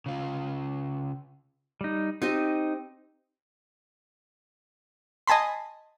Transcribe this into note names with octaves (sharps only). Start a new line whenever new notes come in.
C#3 F4
G3 D#4
C4 D#4 G4 D#5
D#5 G#5 A5 B5 C6